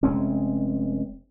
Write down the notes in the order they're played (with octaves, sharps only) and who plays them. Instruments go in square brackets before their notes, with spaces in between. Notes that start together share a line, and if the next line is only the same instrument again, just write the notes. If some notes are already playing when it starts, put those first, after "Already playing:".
[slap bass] F1 G#3 C4 C#4